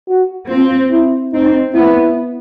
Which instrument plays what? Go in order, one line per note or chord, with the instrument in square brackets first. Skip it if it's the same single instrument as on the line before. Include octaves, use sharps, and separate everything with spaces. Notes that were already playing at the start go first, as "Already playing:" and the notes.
[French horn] F#4
[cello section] C4 [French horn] F4
[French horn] E4
[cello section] C4 [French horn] D#4
[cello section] B3 [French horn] E4